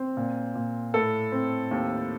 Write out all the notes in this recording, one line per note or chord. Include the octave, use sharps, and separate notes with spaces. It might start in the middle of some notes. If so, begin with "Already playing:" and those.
Already playing: C4
A#2
A#2
A2 A4
C4
D#2